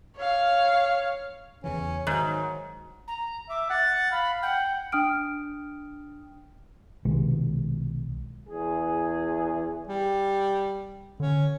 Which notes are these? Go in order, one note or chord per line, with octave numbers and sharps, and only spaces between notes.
C#5 F5
E2 C#3 E3 C#4
G#2 D#3 F#3
A#5
E5 D6
F#5 A6
F5 B5
F#5 G5
D4 G5 D#6 F6 D7
B1 C3 D#3 G#3
E2 G#4
G3
D3 C#4